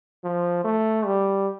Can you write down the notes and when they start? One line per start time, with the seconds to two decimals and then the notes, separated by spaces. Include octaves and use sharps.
0.24 F3
0.64 A3
1.06 G3